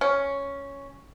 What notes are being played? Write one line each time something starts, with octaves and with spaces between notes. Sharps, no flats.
C#4